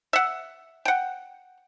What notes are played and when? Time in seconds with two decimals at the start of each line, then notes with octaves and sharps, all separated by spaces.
0.13 E5 F#5
0.85 F#5 G5